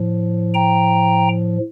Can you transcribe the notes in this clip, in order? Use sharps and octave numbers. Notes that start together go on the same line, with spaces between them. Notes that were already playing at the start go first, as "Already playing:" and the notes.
Already playing: A2 F3
G5 A#5